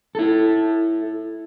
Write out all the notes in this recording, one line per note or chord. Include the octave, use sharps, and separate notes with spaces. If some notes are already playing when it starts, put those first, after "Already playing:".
E4 A4